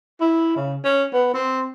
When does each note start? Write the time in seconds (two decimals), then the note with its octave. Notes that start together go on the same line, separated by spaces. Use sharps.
0.21 E4
0.56 C#3
0.84 C#4
1.14 B3
1.34 C4